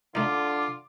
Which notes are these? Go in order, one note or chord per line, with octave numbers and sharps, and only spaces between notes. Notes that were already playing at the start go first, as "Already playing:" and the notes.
D3 A3 D#4 F4 D6